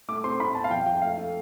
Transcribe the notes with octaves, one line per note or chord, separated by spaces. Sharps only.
A3 D6
C4 C6
A2 B5
B3 A5
F5
F2 G5
F2 G5
A3 F5
A3